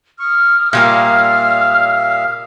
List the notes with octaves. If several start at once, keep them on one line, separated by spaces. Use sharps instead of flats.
C#6 D#6 F6
A#2 G3 A#3 E5 F5